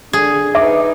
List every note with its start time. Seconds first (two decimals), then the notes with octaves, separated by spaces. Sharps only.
0.13 D3 G#4
0.55 D#4 B4 E5 D6